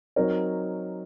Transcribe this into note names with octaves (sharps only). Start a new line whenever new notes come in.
F#3 C4 D#4 A#4 C#5